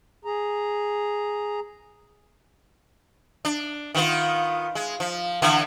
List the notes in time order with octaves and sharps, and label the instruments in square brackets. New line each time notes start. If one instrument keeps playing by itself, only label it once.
[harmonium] G#4 A#5
[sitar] D4
D#3 B3 F4
G#3
F3
D3 E3 B3